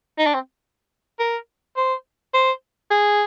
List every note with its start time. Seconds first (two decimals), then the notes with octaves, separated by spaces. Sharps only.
0.19 D#4
0.26 D4
0.34 C4
1.20 A#4
1.77 C5
2.34 C5
2.91 G#4